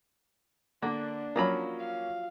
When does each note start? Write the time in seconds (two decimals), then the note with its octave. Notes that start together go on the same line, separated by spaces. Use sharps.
0.82 D3 A#3 D4
1.36 F3 F#3 A#3 C#4 B5
1.80 F5